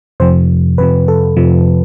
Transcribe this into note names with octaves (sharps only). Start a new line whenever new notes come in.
F2 C3 F3 C5
F2 C3 F3 B4
A4
F2 C3 F3